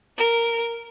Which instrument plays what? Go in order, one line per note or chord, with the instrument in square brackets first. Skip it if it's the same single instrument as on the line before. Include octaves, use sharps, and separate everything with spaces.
[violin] A#4